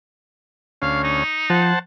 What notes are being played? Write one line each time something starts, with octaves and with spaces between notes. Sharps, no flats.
D2 C#4 F5
D#4
F3 C5 F#5 A5